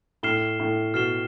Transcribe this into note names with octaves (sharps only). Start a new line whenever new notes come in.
A2 F6 C7 E7 G7
A2
B2 F6 C7 E7 G7